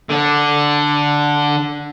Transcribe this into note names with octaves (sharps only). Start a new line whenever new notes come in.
D3 D4